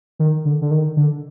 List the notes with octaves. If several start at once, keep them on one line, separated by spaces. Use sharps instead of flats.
D#3
D3
D3
D#3
D3